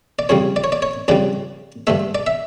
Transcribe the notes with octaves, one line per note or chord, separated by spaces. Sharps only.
D5
F2 C#3 G3 C#5
D5
C#5
D5
C#5
F2 C#3 G3 D5
G2 D3 A3 E5
D5
E5